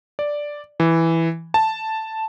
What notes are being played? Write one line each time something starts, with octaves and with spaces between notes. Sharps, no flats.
D5
E3
A5